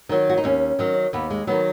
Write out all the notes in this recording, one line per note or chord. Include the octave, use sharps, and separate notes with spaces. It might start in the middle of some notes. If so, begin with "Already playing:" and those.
D#3 F#3
F#4
D#4
D#2 C#4
D#3 F#3
D#2 B3
G#3
D#3 F#3 B3